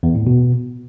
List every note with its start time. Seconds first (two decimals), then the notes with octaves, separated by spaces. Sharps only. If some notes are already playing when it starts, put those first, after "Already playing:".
0.03 E2
0.15 A2
0.27 B2